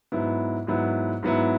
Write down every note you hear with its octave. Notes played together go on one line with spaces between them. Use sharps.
G#2 F#3 B3 E4
G#2 F#3 B3 E4
G#2 F#3 B3 E4